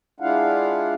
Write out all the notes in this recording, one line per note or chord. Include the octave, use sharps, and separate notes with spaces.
G#3 D4 E4 F4 F5 F#5